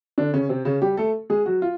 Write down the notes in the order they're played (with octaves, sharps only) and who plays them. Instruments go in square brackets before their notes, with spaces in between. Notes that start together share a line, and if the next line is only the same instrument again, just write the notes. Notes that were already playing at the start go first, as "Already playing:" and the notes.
[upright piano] D3 D4
C#3 C#4
C3 C4
C#3 C#4
G3 G4
A3 A4
G#3 G#4
F#3 F#4
F4